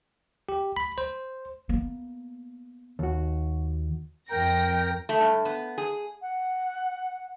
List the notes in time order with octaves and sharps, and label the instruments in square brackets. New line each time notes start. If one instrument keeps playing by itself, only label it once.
[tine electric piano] G4
B5
C5
[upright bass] A#3 B3
[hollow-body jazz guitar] D#2 F#4
[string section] F2 A#6 [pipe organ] A#4 [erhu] G5 [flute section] G6
[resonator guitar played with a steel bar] A3
G2
B3
G#4
[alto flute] F#5